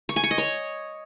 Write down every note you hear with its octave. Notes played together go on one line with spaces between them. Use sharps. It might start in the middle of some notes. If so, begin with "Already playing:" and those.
C#6
G#5
C#6
D#5
C#5